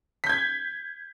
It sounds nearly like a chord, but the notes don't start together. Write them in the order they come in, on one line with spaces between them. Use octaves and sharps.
B6 G6 G#6